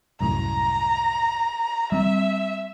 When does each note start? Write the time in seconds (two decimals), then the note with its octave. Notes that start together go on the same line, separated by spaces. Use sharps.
0.20 C2 F#2 A2 A#5
1.92 G3 C4 E5